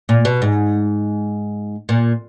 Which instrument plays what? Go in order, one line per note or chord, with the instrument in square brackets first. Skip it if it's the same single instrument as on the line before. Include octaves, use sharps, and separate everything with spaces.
[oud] A#2
B2
G#2
A#2